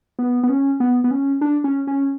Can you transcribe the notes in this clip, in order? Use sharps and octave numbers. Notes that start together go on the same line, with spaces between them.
B3
B3
C#4
B3
B3
C#4
D4
C#4
C#4